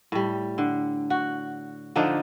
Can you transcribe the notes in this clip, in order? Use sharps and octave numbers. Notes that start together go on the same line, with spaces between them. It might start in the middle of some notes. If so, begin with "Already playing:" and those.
A2 G3
D3
F#4
D3 F3 D4 D#4